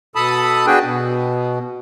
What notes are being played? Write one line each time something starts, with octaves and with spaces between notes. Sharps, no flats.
B2 A4 A5 B5 D#6
B3 D4 F#4 G#4 B4 G5
B2